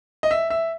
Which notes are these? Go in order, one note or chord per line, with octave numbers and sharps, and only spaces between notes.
D#5
E5
E5